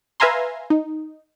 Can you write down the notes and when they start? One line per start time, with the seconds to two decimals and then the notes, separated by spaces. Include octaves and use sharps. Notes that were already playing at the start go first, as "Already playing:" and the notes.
0.20 B4 E5 F5 G#5 A#5 C6
0.70 D#4